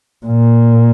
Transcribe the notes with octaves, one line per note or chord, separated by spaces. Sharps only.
A#2